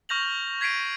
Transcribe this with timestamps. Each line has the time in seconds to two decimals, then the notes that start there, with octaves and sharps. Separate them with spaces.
0.09 C#6 F6 G6 A#6 F7 F#7
0.61 G#6 B6 C7 D7 D#7